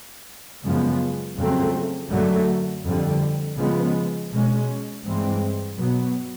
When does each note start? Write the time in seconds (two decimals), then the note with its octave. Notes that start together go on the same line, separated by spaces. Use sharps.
0.64 F#2 C#3 F3 G#3 B3
1.37 F2 C#3 F#3 A3 C4
2.10 F#2 D3 F#3 A3
2.84 F2 D3 G3
3.57 C#3 F3 G#3 B3
4.32 B2 G#3 C#4
5.05 G2 E3 G#3 C4
5.77 B2 F#3 B3